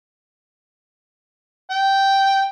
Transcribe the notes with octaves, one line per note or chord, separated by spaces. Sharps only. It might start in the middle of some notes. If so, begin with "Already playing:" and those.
G5